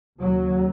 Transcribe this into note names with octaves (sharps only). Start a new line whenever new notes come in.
D#2 C#3 F#3